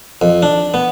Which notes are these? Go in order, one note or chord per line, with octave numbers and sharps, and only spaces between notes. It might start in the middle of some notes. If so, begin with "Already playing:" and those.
F2
D4
B3